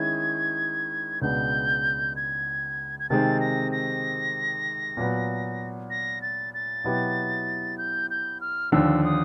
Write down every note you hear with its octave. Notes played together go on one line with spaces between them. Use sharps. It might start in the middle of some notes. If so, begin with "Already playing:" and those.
Already playing: D#3 G#3 C#4 E4 G#6
C#2 B2 G#3 B3 D4 G6
G#6
G#6
C3 D#3 G#3 C4 A6
A#6
A#6
A#2 F#3 B3
A#6
A6
A6
B2 F#3 B3 E4 G4
G6
G6
F6
D#2 D3 F3 E6
D#6